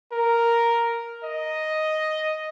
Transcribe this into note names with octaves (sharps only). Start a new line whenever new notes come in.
A#4
D#5